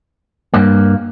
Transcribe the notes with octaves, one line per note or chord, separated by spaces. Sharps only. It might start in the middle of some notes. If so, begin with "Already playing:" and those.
G2 A#3